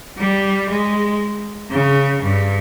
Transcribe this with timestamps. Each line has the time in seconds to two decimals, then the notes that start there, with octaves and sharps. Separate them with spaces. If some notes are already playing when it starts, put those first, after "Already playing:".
0.17 G3
0.69 G#3
1.70 C#3
2.22 G2